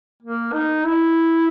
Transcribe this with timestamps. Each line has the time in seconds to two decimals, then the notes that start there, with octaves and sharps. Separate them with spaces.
0.22 A#3
0.52 D#4
0.83 E4